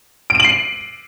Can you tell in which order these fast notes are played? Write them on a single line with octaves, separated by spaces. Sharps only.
D7 D#7 F#7 C7